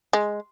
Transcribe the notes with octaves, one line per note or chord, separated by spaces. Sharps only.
G#3